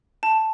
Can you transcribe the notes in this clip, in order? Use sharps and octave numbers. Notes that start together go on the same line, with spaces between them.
A5